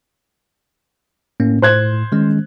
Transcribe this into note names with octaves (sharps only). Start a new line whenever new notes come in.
A2 A#3 C#4
A2 C5 F#6 G#6
D#3 G#3 C#4